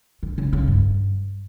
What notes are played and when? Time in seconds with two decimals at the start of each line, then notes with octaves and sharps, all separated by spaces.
0.23 D3
0.38 C#3
0.53 C#3
0.68 G2